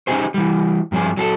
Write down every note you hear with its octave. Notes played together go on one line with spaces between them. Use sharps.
C#4 D#4 E4 G4 G#4 C5
E3 G3
G2 F3 C#4 G#4
F#3 G#4 A4